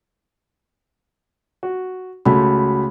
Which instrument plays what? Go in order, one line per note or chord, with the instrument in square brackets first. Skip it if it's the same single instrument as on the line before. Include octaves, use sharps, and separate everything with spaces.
[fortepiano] F#4
[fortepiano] C#2 A3 [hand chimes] F#4 B5